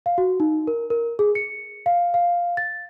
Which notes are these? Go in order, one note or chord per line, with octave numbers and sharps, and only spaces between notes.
F5
F#4
D#4
A#4
A#4
G#4
C#7
F5
F5
A6